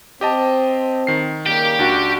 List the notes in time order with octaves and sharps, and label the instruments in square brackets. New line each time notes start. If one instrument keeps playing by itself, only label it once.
[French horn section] C4 [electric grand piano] G4 D#5 A5
[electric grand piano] D#3 C7
[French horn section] C#3 G3 A#3 [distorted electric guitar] G4 G5
[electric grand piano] C#2 D4 F#4